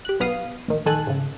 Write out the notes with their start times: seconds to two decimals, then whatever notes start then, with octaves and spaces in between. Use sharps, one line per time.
0.05 G4 F#6
0.20 B1 B2 B3 F5 D#6
0.68 A#1 D#3
0.86 A#1 D#3 A4 G#5 A5 F#6
1.07 G#2 C#3